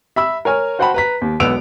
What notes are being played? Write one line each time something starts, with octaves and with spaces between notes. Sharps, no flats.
E5 B5 E6
A#4 C#5 G#5 F6
F#4 C5 F#5 G5 A5 B5
B4 A#5 B6
D#2
E1 B1 B3 E6 D7 F7